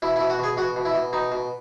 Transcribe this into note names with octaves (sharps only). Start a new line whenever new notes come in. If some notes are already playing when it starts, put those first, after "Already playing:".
B2 E4
E4
B2
F#4
B2 G#4
B2 F#4
B2
E4
B2
B2 D#4
B2